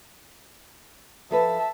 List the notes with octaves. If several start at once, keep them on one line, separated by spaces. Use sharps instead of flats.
F3 A4 B4 E5 A5